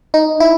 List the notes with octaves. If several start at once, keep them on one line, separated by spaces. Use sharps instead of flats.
D#4
E4